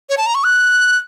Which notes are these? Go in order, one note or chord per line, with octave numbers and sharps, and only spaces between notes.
C#5
A5
A#5
C#6
F#6